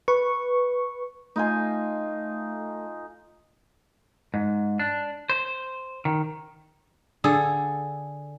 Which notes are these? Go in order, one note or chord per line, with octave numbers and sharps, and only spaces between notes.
B4 C#6
A3 D#4 F4 G#5
G#2
D4
C5
D#3
D3 G#4 A4